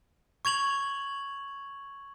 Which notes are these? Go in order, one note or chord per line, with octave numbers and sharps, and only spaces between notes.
C#6 G#6 F7 F#7